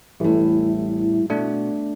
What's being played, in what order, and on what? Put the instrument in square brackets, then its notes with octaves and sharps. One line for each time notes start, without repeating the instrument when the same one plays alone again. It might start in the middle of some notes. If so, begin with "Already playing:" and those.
[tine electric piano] A1 [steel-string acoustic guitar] E2 A2 [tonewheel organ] G3 E4
[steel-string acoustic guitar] B2 [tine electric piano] A3 D4